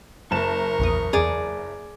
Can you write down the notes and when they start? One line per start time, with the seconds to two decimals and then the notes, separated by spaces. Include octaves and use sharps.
0.31 F#1 A#4 A5 C#6 E7
0.79 A#1 E2 D#6
1.13 E2 G#4 D5 A#5